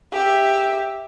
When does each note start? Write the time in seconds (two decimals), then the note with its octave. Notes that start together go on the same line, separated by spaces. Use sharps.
0.13 G4 E5